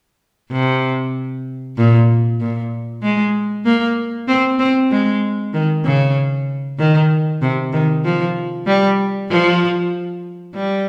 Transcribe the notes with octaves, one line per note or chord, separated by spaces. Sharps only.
C3
A#2
A#2
G#3
A#3
C4
C4
G#3
D#3
C#3
D#3
C3
D#3
F3
G3
F3
G3